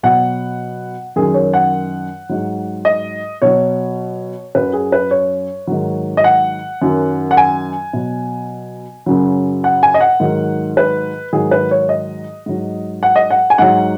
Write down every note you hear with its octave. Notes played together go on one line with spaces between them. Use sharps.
B2 F#3 F#5
F#2 D#3 F#3 G#4
C#5
F#5
G#2 F#3
D#5
B2 F#3 C#5
F#2 F#3 B4
G#4
B4
C#5
G#2 D#3 F#3
D#5
F#5
F#2 D#3 F#3
F#5
G#5
B2 F#3
F#2 C#3 F#3
F#5
G#5
D#5
F#5
G#2 D#3 F#3
B4
G#2 D#3 F#3 G#4
B4
C#5
D#5
G#2 F#3
F#5
D#5
F#5
G#5
G#2 F#3 F#5